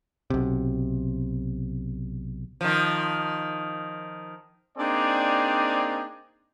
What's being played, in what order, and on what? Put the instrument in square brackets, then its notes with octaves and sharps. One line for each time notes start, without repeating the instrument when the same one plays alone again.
[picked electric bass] B1 C3
[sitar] D#3 F3
[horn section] A#3 C4 D4 D#4 G#4 D5